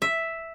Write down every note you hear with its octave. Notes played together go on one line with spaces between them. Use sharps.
E5